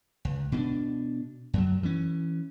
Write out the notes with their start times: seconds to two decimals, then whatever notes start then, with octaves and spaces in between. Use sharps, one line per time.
0.25 C#2
0.52 B2 C#4 D4
1.53 F#2 F#3
1.83 E3 C#4